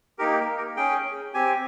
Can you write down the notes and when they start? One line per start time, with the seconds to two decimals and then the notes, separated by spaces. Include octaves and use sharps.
0.19 A#3 D#4 G4 A#4
0.39 A#4
0.57 A#4
0.76 C#4 G#4 G5
1.34 C4 G4 G#5